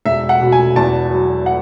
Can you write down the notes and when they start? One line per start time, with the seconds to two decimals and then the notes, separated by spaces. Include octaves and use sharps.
0.05 E1 E5
0.29 F#5
0.41 B2
0.52 G#5
0.76 E2 A5
1.11 F#3
1.46 F#5